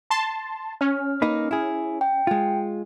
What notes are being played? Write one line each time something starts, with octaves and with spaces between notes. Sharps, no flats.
A5 C6
C#4 F6
A#3 D#4 B4
E4 G#4
G5
G#3 F4